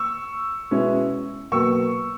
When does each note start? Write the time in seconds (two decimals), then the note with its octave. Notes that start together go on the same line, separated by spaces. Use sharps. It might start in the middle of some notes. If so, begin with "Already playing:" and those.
Already playing: C#6 E6
0.71 B2 G#3 C#4 E4
1.52 B2 F#3 A#3 C#6 E6